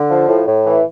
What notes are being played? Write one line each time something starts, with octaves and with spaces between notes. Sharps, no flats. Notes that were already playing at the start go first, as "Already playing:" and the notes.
Already playing: D3
F3
A2
A2
E3